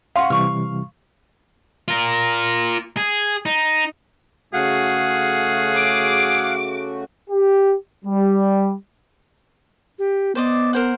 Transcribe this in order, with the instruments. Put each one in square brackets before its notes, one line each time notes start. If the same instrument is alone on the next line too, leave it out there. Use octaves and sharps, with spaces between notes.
[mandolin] C#4 F#4 [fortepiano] F5 C6
[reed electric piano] C3 E3 G3 [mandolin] C#6 F6
[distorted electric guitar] F4 A#4
G#4
D#4
[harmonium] C#3 A3 F#4 [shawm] G#4 [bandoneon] F5 F#5
[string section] D6
[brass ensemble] G4
G3
[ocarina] G4
[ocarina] B3 [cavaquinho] C5 D5 D#5
[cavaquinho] A#4 C5 F#5